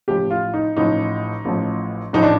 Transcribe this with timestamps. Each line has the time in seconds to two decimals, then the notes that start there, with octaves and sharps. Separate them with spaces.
0.08 A1 A2 F3 G4
0.30 F4
0.54 D#4
0.77 A1 A2 F3 D#4
1.45 A1 A2 F3
2.13 A1 A2 F3 D#4
2.23 D4